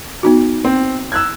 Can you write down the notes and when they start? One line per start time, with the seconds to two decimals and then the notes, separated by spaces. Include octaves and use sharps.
0.23 B3 D#4 F#4
0.65 C4
1.12 E6 F#6 G#6